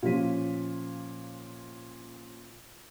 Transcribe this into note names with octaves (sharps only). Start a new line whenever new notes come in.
A#2 F3 C#4 F4 B6 D#7